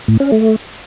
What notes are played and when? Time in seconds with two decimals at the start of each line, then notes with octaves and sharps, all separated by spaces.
0.08 A2
0.20 C#4
0.32 A3